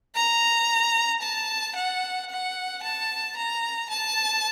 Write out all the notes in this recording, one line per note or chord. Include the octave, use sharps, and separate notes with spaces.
A#5
A5
F#5
F#5
A5
A#5
A5